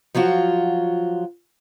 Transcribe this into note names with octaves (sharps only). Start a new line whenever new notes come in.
F3 F#3 F4 F#4